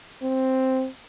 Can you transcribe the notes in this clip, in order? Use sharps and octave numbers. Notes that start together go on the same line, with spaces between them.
C4